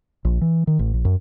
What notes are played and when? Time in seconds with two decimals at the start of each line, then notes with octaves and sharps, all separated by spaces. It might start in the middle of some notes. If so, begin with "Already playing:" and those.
0.25 A#1
0.41 E3
0.67 D#3
0.79 A1
0.94 A#1
1.05 F#2